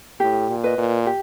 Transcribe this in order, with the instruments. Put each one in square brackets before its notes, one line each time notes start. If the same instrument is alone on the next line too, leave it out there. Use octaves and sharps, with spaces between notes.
[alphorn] A2 [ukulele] G4
[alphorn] A#2
[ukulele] B4 D#5
[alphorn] A#2
[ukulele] G4